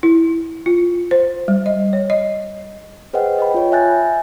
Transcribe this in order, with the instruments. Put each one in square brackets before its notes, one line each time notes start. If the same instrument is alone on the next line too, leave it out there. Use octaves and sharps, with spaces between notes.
[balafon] E4
F4
C5
G3
D#5
C#5
D#5
[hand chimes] G#4 B4 C5 D#5 F#5 G5
D#5 G5 B5
F4 C#5
E5 G#5 F#6 G6 A6